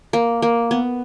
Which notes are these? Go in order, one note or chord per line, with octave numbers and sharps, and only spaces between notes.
A#3
A#3
B3